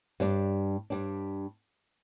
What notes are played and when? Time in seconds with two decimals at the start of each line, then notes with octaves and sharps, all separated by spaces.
0.20 G2 G3 D4
0.90 G2 G3 D4